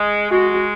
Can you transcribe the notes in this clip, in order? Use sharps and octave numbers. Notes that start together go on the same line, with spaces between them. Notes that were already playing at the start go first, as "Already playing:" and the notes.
Already playing: G#3
G#3 F#4